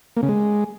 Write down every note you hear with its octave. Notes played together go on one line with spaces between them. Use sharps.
A#3
C#3
G#3